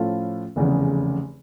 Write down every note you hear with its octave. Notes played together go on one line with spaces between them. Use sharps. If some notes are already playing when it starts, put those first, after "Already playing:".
Already playing: A2 F3 C#4 F4 A4
F1 E2 C#3